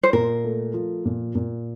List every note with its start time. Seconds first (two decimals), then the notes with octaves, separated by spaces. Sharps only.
0.03 C5
0.13 A#2 A#4
0.44 A3
0.74 F3
1.05 A#2
1.35 A#2